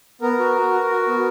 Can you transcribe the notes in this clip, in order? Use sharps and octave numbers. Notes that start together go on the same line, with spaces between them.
B3 A#4
F#4
F#4
F#4
F#4
B3